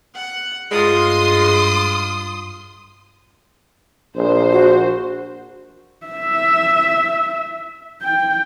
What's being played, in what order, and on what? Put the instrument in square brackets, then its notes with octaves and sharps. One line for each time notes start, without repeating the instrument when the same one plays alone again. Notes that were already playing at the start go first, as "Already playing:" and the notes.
[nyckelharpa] F#5
[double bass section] G2 [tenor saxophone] G#3 [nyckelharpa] F4 [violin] C6 D#6
[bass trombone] A#1 [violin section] C5
[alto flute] F#4
[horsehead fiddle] E5
G5